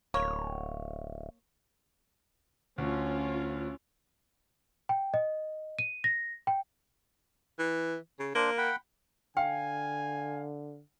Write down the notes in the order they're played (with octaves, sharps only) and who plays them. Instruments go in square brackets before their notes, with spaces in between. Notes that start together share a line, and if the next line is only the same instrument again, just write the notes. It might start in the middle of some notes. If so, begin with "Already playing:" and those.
[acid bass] D1 [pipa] A#3 C#5
[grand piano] D2 [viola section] C#4 F4
[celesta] G5
D#5
D#7
A#6
G5
[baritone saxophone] E3
C#3
[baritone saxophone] A#3 [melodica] D4 C5
[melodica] F#5 G5 B5
[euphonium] D3 [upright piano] F5 [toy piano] G5 [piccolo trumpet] G#5